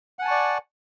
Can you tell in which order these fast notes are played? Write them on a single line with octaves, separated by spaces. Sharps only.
F#5 G#5 A5 C#6 D5